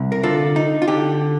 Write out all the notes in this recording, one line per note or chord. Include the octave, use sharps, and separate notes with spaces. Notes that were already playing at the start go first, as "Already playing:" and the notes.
Already playing: C2
A#4
D3 F4 A4
D#4
F4
D3 G4